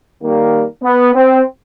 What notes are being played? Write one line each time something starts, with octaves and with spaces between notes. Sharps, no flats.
D#3 G3 A#3
B3
C4